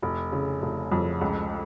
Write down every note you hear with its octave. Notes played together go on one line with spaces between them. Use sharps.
F1
C#3
F1
F2
C#2